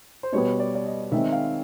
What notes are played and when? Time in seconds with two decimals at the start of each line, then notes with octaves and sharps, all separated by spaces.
0.23 C5
0.32 B2 G3 B3 C#5
0.59 D5
0.75 D5
0.86 D#5
1.12 D#3 G#3 C4 E5
1.33 F5